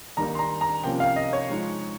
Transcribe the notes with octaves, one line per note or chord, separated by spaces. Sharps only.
D#3 G3 A#3 D#4 A#5
C6
A#5
A#5
C3 F3 A#3 C#4 G5
F5
D#5
C#5
F3 G#3 D#4